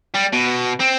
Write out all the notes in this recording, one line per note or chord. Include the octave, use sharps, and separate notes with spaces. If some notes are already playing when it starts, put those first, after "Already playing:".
G3
B2
C4